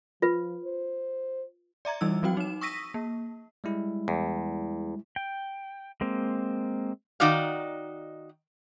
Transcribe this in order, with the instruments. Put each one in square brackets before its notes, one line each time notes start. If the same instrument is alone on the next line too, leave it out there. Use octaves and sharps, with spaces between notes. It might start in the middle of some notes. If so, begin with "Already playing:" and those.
[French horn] F3 [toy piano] F4 B4
[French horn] C5
[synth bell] D5 E5 A#5 G#6
E3 G3 D#4 E4 E6
F3 F#3 C4 F#4 G5
D#4 E7
C#6 D#6 E6 A#6 B6 D#7
A#3
[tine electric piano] G3 G#3 E4
[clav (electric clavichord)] E2
[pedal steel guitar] G5
G#3 A#3 C4
[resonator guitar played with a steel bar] D#3 D#4 F#4 D5 F5